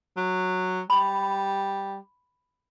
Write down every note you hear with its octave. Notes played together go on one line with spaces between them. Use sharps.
F#3
G3 B5